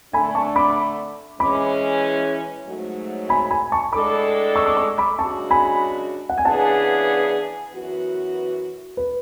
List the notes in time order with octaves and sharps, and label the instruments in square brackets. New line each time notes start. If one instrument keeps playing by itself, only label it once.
[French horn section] D3 A3 D4 [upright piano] G#5 B5
[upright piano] A5 C#6
B5 D6
[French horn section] E3 G#3 C#4 [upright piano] B5 D6
[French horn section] G#2 F#3 A3
[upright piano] G#5 B5
G#5 B5
A5 C#6
[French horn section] A2 G#3 D4 A4 [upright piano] B5 D6
[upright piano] C#6 E6
D6
C#6 E6
B5 D6
[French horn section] F#2 C#3 G#3 D4 F#4 [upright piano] A5 C#6
[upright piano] G#5 B5
F#5
G#5
[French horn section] C#3 E3 B3 D4 G#4 [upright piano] F#5 A5
[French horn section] F#2 E3 B3 F#4
[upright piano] B4